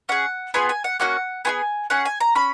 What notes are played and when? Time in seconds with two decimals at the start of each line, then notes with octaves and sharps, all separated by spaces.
0.09 C#4 G#4 F#5
0.54 B3 F4 G#4 G#5
0.69 G#5
0.84 F#5
1.00 A#3 C#4 F#4 F#5
1.45 B3 F4 G#4 G#5
1.90 C#4 G#4 F#5
2.05 G#5
2.20 A#5
2.35 C#4 B5